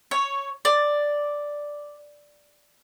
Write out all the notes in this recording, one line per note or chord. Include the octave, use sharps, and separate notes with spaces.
C#5
D5